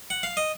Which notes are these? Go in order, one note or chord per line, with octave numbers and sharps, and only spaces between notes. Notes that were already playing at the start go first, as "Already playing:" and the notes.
F#5
F5
D#5